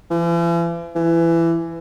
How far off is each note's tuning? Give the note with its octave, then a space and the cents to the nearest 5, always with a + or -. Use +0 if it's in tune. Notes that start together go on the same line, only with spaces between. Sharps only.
E3 +45
E3 +20